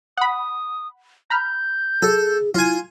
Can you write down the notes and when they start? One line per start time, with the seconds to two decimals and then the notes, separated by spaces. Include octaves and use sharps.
0.17 F#5 B5 D#6
1.30 A#5 B5 F6 G6
2.02 F#3 G#4 A4
2.54 F#3 E4 F4 G#5 G#6